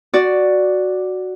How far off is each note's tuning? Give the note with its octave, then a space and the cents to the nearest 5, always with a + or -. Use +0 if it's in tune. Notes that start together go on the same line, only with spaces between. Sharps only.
F#4 +0 D5 +0